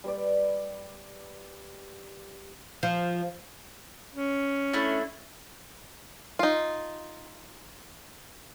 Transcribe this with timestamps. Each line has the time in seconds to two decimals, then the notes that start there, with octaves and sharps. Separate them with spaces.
0.04 G3 B4 D5
2.83 F3
4.15 C#4
4.73 A3 D4 E4
6.39 D#4 F4